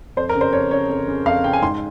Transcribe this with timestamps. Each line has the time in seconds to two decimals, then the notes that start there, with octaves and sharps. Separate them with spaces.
0.17 F2 C5
0.29 A#4
0.35 C#3
0.41 C5
0.53 F2 C#5
0.71 C#3 C#5
0.89 F2
1.08 C#3
1.26 F2 F5
1.44 C#3 G5
1.53 G#5
1.62 G#2 C6